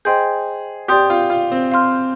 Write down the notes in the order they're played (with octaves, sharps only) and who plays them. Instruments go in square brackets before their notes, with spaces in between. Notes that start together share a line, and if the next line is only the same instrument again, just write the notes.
[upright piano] G#4 [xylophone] C5 D#5 G5 C6 G6
[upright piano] G4 [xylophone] D5 G5 C6 D#6 G6
[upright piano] F4
F4
C4
[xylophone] F5 C6 F6